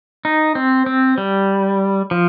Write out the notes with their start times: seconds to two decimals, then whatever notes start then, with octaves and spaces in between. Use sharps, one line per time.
0.25 D#4
0.55 C4
0.86 C4
1.18 G3
2.11 F3